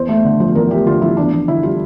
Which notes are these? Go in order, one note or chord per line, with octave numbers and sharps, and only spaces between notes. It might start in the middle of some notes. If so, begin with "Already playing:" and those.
Already playing: E2 C5
A3
D3
F3
E2 A#4
A3 G4
D3 F4
F3 E4
E2 D4
E2
D3 E4
G3 F4